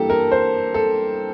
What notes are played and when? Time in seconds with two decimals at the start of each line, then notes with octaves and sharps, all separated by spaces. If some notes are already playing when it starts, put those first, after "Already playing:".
Already playing: G2 E3 A#3 G4 A4
0.10 A#4
0.32 C5
0.74 A4